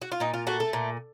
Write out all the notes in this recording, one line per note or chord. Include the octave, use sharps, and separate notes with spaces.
F#4
F4
A#2 D#4
F4
A3 F#4
A4
A#2